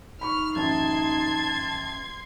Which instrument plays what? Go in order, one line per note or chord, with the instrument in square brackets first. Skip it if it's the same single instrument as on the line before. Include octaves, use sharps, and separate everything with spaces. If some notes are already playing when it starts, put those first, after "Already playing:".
[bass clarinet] D#4 [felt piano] B5 C#6 [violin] F6
[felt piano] A1 F#2 [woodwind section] A5 [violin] C6 G#6